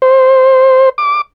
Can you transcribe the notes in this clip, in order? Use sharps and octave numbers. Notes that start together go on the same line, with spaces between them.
C5
D6